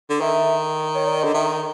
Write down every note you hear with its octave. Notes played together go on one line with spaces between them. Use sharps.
D3
D#3 E5
C#5
D5
D3 D#5
D#3 E5